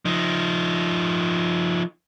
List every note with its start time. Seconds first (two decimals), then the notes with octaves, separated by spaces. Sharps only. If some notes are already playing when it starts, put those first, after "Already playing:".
0.05 F3 D#4